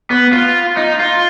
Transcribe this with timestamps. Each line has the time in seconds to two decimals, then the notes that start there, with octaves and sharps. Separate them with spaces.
0.11 B3
0.32 F4
0.77 D#4
0.99 F4